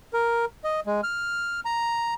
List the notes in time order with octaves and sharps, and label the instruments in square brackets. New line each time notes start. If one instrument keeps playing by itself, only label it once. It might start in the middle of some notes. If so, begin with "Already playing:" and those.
[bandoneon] A#4
D#5
G#3
F6
A#5